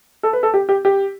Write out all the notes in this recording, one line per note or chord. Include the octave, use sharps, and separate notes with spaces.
A4
B4
A4
G4
G4
G4